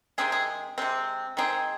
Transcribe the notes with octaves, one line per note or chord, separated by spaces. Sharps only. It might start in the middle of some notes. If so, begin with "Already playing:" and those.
C3 D#3 G#3 C4 G#4
G#4
C3 G#3 C4
D#3 G#3 C4 D#4 G#4